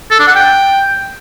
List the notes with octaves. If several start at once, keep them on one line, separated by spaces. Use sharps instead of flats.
A4
D4
F#5
G5